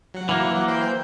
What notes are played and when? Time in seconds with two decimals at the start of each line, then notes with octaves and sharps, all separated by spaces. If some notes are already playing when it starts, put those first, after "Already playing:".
0.14 F#3 F#5
0.29 E3 A#3
0.68 C5 G5 G6